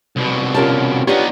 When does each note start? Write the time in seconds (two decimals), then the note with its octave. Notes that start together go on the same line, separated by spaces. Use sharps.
0.17 C2 B2
0.54 C#4 F4 G4 A#4 A5
1.07 B3 D4 D#4 F4 G4 C#5